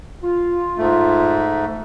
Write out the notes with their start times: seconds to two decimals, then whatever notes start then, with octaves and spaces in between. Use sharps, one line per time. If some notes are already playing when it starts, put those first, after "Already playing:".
0.23 F4
0.78 G#2 A3